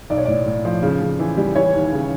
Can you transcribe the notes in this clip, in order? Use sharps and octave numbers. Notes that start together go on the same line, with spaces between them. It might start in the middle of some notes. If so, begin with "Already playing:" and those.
B1 D5
C#5
A2 D5
A2
F3
C#3
C#3
E3
G3
E3 C#5
D#2
C#3